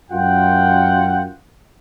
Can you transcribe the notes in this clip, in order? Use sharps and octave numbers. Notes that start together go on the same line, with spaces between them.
F#2 F4 F#5 G5